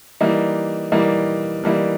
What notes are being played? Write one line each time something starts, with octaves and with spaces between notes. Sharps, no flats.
E3 G3 A#3 D#4
E3 G3 A#3 D#4
E3 G3 A#3 D#4